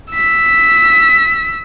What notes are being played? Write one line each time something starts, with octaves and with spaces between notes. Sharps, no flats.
E6 B6